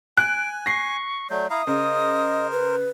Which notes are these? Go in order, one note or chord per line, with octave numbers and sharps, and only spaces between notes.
G#5 F#6 D7
C#6 A#6 C7
F#3 A3 D5 G6
E4 E5 F5 A#5 D#6
C#3 A#4 C5 D#5
B4